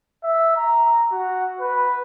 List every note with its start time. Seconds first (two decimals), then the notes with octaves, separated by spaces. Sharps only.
0.24 E5
0.57 A#5
1.12 F#4
1.61 B4